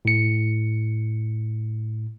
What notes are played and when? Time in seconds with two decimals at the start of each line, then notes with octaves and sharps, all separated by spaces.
0.05 A2 C#7